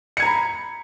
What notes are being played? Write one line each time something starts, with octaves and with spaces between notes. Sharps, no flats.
A#5 B5 G#6 C#7